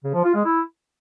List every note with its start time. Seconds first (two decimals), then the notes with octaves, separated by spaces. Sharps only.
0.04 C#3
0.14 F3
0.25 F4
0.35 G#3
0.45 E4